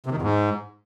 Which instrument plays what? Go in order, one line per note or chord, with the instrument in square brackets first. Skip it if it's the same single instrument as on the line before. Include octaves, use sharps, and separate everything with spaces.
[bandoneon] C3
D#3
E2
G#2